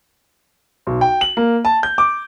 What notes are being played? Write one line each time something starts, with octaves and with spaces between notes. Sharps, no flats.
B1
G5
F#7
A#3
A5
G6
D6